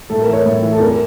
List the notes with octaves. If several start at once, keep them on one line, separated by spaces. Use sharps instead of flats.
A2 A4
A#4
E3
C#5
A2
E3
A4
E2 A#4